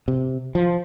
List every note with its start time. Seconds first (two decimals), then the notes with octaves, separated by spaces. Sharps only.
0.08 C3
0.55 F3